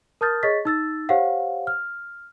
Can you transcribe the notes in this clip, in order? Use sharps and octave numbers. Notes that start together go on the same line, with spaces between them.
A#4 A5 D#6 F6 G6 A6
G#4 C#5 D#5 C#6 A6 B6
D#4 E6 A6
G4 C5 C#5 F5 F#5
F6